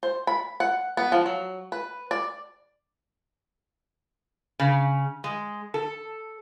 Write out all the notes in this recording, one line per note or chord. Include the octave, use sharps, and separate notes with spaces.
C5
B5
F#5
B3
F3
F#3
B4
D5
C#3
G#3
A4